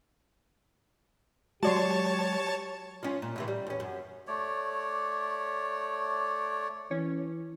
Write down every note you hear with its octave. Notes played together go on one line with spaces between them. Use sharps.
F#3 G#3 F#4 G4 C#5 D5 A5 C6
F3 C#4
A#2
A2 C3 E3
G3
E2 C#4
F#2
A3 C#5 D5
E3 C#4